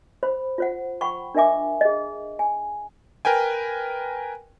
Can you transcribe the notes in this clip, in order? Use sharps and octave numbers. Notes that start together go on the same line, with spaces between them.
C5 B5
F4 C5 F#5
F#5 G5 B5 C#6
D4 A#4 D#5 E5 G#5 D6
G#4 D#5
G#5
A#4 B4 G5 G#5